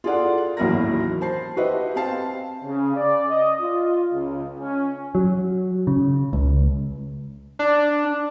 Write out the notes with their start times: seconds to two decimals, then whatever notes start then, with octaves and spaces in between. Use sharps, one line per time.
0.04 F4 G#4 A4 D5 F#5
0.57 A1 D#2 F#3 E4 A#4 A#6
1.21 C5 A5 C7
1.57 F#4 G4 B4 C5 D#5 E5
1.95 C4 G4 F5 A5 C7
2.64 C#3
2.96 D5
3.29 D#5
3.61 F4
4.13 C#2
4.59 C#4
5.15 F#3
5.87 C#3
6.33 C#2
7.59 D4